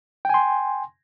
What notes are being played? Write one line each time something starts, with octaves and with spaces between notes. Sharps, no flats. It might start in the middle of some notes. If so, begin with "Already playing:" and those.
G5 G#5 C6